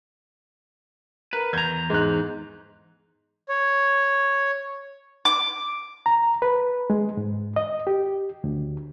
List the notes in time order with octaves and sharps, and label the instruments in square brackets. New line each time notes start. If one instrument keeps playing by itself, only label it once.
[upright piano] A#4 [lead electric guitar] B4
[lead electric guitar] E2 A#5 [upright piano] G6 G#6
[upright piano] G#2 F#6
[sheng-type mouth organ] C#5
[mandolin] D6
[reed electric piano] A#5
B4
G#3
G#2
D#5
G4
D2